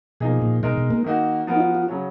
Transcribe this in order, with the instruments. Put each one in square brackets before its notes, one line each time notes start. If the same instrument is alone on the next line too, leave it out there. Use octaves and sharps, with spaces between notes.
[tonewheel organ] B2 [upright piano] F3 A#3 D#4 G#4
[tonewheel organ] A#2
[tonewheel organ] B2 [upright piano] G#3 D#4 A#4
[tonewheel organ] B2
A#3
[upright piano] D#3 A#3 D#4 F#4
F3 B3 F#4 A#4
[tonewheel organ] D#4
F4
F4
[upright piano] C#3 F#3 C#4